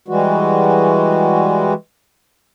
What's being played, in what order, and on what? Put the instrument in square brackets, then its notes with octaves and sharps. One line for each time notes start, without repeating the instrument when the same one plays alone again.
[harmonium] E3 G3 G#3 F#4